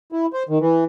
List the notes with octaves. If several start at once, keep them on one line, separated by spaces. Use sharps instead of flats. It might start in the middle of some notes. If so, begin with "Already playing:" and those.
E4
C5
D#3
E3